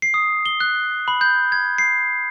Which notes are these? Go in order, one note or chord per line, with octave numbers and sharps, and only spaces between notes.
C7
D#6
G7
F#6
B5
G6
G#6
C7